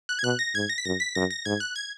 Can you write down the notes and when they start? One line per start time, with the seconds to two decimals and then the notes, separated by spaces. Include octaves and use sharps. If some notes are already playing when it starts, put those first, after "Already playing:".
0.09 F#6
0.19 G#6
0.23 B2 F#6
0.39 A#6
0.55 G#2 G#6
0.69 A#6
0.78 B6
0.85 F#2 A#6
1.00 B6
1.15 F#2 A#6
1.31 A#6
1.45 G#2 G#6
1.60 F#6
1.76 G#6